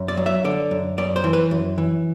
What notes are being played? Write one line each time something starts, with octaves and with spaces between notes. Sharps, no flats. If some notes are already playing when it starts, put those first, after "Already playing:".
Already playing: F#2
D5
F#3
E5
D3 D5
F#2
F#2 D5
C5
E3
B4
F#2
E3